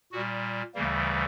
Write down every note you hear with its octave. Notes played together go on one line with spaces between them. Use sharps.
A#2 G3 F#4
D2 C#3 E3 G3 A#3